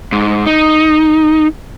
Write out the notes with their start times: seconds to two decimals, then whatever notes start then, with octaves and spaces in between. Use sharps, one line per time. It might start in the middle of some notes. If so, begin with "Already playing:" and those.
0.12 G#2
0.46 D#4